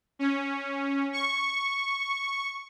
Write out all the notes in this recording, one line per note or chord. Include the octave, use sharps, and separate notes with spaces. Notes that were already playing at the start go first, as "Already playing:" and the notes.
C#4
C#6